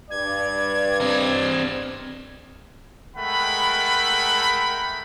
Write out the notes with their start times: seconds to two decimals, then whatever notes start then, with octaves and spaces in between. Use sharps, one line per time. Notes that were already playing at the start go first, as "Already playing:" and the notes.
0.11 G2 D5 G#6
1.01 C4 D#5
3.17 G#3 A3 A#4 F#5 G5 B5